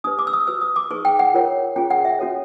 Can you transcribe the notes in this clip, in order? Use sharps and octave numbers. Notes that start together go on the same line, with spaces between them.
D4 G4 B4 D#6
D6
E6
D#6
F#4 B4 E6
D#6
D6
D#4 G#4 B4 C#6
G5
F#5
F4 A#4 C#5
C#4 F4 G#4 G5
F#5
E5
C#4 F#4 A4 C#5